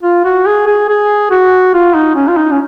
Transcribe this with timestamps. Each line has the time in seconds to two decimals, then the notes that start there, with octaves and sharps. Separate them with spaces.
0.03 F4
0.25 F#4
0.46 G#4
0.67 G#4
0.89 G#4
1.31 F#4
1.74 F4
1.95 D#4
2.16 C#4
2.28 F4
2.37 D#4
2.52 C#4